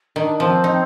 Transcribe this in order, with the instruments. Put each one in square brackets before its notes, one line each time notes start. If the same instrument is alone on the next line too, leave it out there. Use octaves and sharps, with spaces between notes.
[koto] D#3 [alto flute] D4
[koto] F3 [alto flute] C4
[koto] D#4